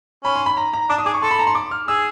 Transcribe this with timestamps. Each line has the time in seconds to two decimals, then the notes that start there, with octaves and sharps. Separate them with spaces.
0.24 C#4 B5
0.36 C6
0.46 B5
0.57 A#5
0.73 A#5
0.90 D4 D6
0.98 D#6
1.06 G#4 D6
1.14 C#6
1.22 A4 C6
1.31 B5
1.39 A#5
1.47 C6
1.55 D6
1.71 F6
1.88 G#4 E6